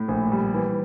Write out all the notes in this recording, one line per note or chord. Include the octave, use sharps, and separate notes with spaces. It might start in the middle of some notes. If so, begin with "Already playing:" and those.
Already playing: A2
A#1
G3
E3